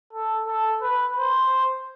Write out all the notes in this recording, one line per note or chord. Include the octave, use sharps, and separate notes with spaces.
A4
A4
B4
C5